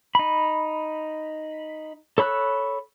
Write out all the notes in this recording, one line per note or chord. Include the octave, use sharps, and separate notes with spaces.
D#4 B5
A4 C#5 B5 E6 F#6